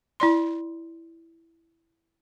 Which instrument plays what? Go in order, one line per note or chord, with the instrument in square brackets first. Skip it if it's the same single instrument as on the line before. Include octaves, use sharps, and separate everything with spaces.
[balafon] E4 D5 C6